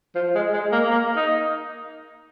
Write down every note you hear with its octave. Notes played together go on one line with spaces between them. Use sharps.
F3
G#3
G#3
A#3
A#3
D#4